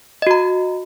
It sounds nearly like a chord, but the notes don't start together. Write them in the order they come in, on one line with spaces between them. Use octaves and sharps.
D#5 F#4 A#5